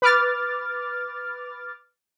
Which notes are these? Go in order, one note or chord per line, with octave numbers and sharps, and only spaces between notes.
B4 D6 F6 A6